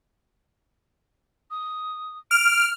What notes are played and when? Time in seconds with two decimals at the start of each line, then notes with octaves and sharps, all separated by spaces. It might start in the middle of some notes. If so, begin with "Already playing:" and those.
1.51 D#6
2.31 F6 D7